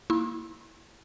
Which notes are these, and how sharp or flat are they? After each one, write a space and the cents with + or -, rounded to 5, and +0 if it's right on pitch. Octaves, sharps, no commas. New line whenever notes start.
A#3 +0 E4 -10 C6 +45